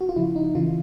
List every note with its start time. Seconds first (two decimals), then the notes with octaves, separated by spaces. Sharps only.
0.01 F#4
0.09 F4
0.16 C#3 F3 E4
0.36 D#4
0.55 C#3 E3 F4